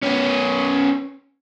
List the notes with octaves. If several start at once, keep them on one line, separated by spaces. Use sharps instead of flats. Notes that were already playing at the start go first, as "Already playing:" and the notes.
B3 C#4